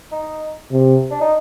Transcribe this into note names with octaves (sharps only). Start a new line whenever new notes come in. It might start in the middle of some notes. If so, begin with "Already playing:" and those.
D#4
C3
D4
D#4